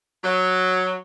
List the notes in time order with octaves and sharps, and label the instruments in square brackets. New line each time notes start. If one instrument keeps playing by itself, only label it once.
[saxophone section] F#3